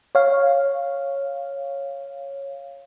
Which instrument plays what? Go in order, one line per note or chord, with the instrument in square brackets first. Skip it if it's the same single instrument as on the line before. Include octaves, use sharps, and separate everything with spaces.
[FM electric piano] C#5 F5